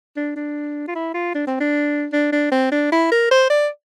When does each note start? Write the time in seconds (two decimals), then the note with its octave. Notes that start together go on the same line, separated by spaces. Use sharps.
0.16 D4
0.36 D4
0.87 F4
0.95 E4
1.14 F4
1.34 D4
1.47 C4
1.60 D4
2.13 D4
2.32 D4
2.51 C4
2.72 D4
2.92 E4
3.11 A#4
3.31 C5
3.50 D5